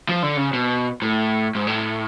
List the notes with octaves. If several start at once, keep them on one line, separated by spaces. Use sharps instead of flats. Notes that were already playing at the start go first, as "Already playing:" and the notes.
F3
D3
C#3
B2
A2
G#2
A2